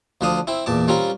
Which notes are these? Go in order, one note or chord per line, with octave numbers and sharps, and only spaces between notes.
D2 F3 D4 F5 D#6
C4 E4
E2 A#2 A5 D6
G3 C4 C#4 F4 A#4